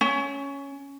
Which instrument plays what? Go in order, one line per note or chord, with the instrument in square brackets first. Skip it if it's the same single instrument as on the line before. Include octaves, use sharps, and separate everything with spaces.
[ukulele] C#4